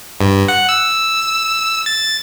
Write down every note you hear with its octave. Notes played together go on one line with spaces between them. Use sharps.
G2
F#5
E6
A6